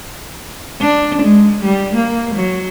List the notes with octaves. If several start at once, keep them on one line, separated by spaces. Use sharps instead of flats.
D4
G#3
G3
A#3
F#3